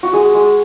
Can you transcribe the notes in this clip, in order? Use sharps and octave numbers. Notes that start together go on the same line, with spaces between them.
F#4
G#3 G#4
G#3